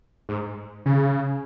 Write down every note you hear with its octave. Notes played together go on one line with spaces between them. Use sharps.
G#2
C#3